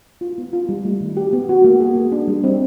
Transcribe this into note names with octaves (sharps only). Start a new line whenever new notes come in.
F4
B3
F4
G3
A3
D#3
G4
B3
F#4
A#3
G#4
A#3
D4
G3
C4